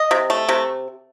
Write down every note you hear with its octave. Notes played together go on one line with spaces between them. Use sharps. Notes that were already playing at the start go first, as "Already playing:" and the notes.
Already playing: D#5
C3
A3
C3